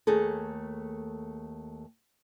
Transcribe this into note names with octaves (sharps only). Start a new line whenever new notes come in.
D#2 A3 G#4 A4